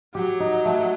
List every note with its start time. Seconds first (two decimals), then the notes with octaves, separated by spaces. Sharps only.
0.14 F#3 G4
0.40 D#4
0.65 A3